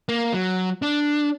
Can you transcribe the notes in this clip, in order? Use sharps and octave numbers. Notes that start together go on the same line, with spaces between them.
A#3
F#3
D4